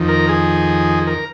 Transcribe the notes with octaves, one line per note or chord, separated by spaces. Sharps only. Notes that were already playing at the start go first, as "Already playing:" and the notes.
Already playing: F2 D#3
A#4
G#4
A#4